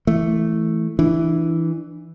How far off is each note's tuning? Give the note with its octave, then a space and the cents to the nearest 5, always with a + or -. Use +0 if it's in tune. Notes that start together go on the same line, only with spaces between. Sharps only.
E3 +0 A3 +0
E3 +0 D4 +30